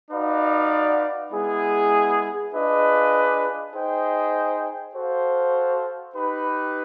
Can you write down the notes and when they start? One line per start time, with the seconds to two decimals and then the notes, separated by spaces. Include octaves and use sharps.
0.11 D#4 F#4 B4 D5 F5
1.32 G#3 B3 E4 G#4
2.53 D4 F4 G#4 B4 D#5
3.74 D#4 G#4 C5 D#5 G5
4.94 F#4 A4 C5 F5
6.15 D#4 G4 B4